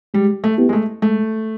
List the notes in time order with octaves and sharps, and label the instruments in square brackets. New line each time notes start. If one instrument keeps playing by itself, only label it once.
[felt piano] G3 [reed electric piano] G#3
[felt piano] A3
[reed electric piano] B3 E4 G4
[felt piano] G#3
A3
[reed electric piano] G#3 [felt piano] A3